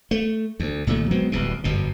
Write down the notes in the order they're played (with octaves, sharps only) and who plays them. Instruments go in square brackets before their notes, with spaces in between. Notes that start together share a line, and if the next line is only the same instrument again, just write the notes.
[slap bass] A3
D2
C2 A#2 D#3 A3
F#3 G#3 B3 C4
D1 C2 B2
G1 F#2 B2